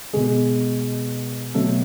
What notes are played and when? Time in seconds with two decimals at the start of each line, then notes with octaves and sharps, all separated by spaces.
0.13 B2 G#3 G#4
1.54 B2 F#3 A3 A4